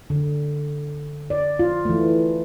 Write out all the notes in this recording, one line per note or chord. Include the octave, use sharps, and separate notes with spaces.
D3
D5
F4
E3 A3